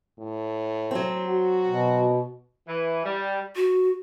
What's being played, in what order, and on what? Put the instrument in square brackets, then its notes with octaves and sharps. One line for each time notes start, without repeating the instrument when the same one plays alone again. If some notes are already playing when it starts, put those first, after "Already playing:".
[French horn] A2
[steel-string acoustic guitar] F#3 C4
[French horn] F#4
[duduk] B2
[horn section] E3
G3
[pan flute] F#4